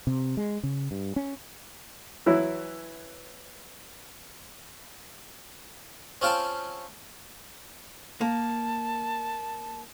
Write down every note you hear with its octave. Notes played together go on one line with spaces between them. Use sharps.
C3
G#3
C#3
G2
C#4
E3 F#3 E4
C4 C#4 F4 F5 G5 A5
A#3 A5